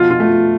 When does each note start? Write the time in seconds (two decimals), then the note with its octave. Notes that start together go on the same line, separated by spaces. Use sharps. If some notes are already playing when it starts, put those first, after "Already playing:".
Already playing: B2 F3 F4
0.10 F4
0.20 A3